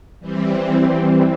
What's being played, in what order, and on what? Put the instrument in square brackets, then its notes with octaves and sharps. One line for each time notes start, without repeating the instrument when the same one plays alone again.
[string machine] E3 G3 C4